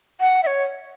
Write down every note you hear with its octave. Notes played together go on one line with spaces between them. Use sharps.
F#5
E5
C#5